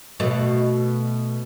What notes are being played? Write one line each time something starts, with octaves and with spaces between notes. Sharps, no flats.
B2 A3